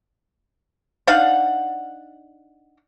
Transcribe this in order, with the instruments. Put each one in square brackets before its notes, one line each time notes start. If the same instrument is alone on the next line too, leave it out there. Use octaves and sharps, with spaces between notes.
[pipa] D4 D#4 F5 F#5